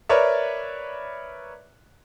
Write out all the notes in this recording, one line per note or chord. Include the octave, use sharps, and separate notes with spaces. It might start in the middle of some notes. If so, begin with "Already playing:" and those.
A#4 B4 C#5 D5 E5